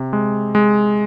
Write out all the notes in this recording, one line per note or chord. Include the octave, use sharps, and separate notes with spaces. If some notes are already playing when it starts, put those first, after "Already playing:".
Already playing: C3
G#3
G#3